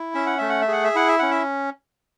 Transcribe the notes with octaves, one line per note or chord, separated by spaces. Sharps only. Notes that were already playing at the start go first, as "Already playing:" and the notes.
Already playing: E4
C#4 E5
F#5
A3 E5
F#5
E5
G#4 F#5
E5
E4 F#5
E5
C#4 F#5
E5